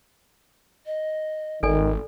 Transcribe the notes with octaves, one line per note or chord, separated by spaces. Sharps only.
D#5
G#1 D#3 A4 D5 G#5